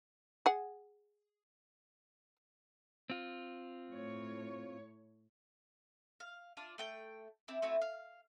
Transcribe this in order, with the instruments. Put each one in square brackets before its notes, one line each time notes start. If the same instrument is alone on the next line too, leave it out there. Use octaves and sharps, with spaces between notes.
[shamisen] G#4 F#5
[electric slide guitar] C4 F4
[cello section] A2 C#5
[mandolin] F5
D4 F4 D5
A3 G5 G6
C4 D4 E4
A3 C4 E4 F#4
F5